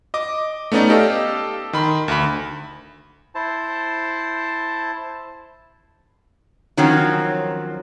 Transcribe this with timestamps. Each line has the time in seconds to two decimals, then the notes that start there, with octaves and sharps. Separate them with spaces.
0.14 D#5 D6
0.72 A3 B3 C#4 D#4 D5
0.89 G4 A4 D#5 F5
1.73 D#3 B5 C6
2.08 D2 B5
3.35 E4 C5 A5
6.77 D#3 F3 F#3 C4 C#4